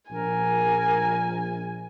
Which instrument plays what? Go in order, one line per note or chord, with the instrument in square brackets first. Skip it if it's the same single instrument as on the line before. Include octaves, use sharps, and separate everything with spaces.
[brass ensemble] A#1 [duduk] A#4 [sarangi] G#5